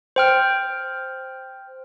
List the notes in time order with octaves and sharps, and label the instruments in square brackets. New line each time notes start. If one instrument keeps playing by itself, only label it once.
[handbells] C5 G5 F6